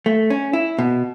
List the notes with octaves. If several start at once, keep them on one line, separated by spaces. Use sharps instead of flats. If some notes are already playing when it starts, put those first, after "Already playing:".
A3
C#4
E4
B2